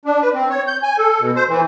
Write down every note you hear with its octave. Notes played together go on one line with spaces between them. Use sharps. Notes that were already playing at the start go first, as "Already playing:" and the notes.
D4
B4
C4
C#5
G6
G#5
A4
B2
C5
E3